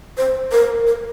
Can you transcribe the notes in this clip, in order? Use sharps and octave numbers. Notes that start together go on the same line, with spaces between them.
C5
A#4
A#4